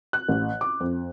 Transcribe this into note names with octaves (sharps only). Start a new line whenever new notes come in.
F#6
A1
D6
F2